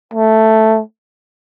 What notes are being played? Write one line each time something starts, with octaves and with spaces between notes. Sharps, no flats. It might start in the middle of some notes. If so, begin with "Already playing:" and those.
A3